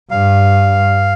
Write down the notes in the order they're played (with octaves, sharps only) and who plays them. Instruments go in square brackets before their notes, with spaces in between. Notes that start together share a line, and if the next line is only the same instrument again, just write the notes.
[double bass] G2 [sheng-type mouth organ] F5